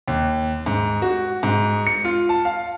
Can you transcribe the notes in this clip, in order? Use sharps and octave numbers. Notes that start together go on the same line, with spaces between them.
D#2
G#2
F#4
G#2
C#7
F4
A5
F5